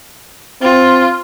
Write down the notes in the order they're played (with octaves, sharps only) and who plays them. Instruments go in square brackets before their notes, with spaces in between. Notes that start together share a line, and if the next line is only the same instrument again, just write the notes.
[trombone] C4 [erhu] F4